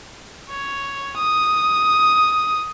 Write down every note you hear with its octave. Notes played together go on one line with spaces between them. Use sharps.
C#5
D#6